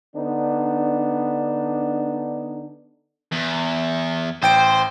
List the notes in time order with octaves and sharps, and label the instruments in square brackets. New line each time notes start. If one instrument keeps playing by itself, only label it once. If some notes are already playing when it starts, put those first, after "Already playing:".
[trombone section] D3 B3 D4 D#4
[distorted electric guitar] E2
[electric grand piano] A1 G5 D7 [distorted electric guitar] C5